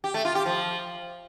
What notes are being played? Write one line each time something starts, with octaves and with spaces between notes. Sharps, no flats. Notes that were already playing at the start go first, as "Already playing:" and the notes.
G4
A3
F4
G4
F3